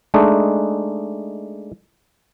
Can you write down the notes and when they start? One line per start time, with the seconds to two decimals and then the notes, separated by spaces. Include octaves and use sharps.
0.14 G#3 A3 D4 D#4